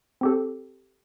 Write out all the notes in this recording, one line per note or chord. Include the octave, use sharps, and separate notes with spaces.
C4 G4 A4